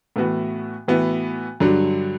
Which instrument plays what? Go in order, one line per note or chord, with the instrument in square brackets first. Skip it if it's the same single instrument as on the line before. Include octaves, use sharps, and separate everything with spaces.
[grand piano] A2 E3 B3 F#4
A2 E3 B3 F#4
G2 D3 F#3